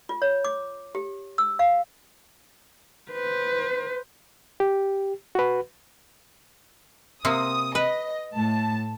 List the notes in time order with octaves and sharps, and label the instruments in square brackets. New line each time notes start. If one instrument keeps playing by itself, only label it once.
[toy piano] F4
C#5
D6
G4
E6
F5
[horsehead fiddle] B4 C5
[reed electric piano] G4
F#4 B4
[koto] C3 A#3 C4 [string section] D#6
[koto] B4 [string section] D#5
[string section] A2 A5